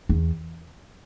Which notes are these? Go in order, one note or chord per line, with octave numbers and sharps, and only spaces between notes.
E2